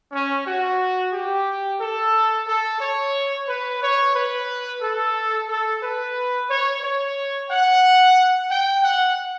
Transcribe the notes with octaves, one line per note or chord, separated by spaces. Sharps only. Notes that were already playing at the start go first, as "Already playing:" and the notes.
C#4
F#4
G4
A4
A4
C#5
B4
C#5
B4
A4
A4
B4
C#5
C#5
F#5
G5
F#5